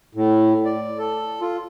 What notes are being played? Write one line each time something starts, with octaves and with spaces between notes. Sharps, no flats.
A2
D5
A4
F4